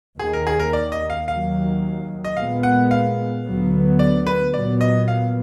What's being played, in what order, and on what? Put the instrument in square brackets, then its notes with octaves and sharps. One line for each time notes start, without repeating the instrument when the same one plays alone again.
[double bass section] D#2 D#3 A#3 [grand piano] G#4
[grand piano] A#4
G#4
A#4
D5
D#5
F5
[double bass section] D#2 D#3 F#3 [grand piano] F5
[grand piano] D#5
[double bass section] A#2 G#3 B3 [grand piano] F5
[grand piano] F#5
F5
[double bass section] D2 D3 F#3 B3
[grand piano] D5
B4
[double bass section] A#2 F#3 B3 [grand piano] D5
[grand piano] D#5
F5